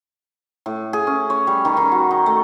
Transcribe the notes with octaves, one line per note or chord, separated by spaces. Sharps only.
A2
G#4
C#4
C#5
G3
D#3
D#3
F#4
D#4
A3